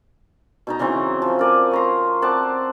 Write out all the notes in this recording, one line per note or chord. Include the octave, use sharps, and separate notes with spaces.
B2 D#4 A#5
C#3 E3 F#3 C4
F3
A#4 D5 G#5
C#5 A#5 C6
C4 D5 F#5 A5